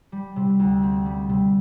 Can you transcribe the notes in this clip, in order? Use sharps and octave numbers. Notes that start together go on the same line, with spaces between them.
G3
C3
D2
C4
G3
C3